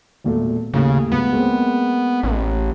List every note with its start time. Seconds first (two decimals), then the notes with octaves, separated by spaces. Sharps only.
0.24 E1 A#2 A3
0.74 D#2 A2 C#3
1.12 C#2 B3
1.32 G#3 A#3 C4
2.23 A1